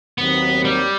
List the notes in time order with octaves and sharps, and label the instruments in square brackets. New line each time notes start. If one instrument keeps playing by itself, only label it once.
[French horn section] D#2 D#3 F#3 C4 [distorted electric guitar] B3
[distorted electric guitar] G3